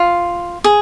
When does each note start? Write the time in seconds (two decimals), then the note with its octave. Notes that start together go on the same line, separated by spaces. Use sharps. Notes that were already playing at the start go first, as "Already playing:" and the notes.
Already playing: F4
0.64 G#4